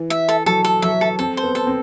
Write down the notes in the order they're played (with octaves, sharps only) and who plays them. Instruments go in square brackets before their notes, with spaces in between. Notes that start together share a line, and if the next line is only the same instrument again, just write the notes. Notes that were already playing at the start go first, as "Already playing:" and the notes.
Already playing: [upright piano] E3
[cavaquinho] E5
A4
[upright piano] F#3 [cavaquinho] A4
[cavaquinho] A4
[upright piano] F#3 [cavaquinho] E5
[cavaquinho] A4
[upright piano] C4 [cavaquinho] A4
[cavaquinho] C5
[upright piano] B3
[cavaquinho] A4
[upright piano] C4